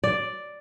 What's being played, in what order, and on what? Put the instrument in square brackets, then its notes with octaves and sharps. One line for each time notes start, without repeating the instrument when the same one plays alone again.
[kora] D5